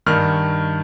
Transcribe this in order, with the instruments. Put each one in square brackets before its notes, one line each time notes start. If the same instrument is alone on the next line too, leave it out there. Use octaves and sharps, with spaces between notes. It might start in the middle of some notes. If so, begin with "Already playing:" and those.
[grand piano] G2 D#3 F6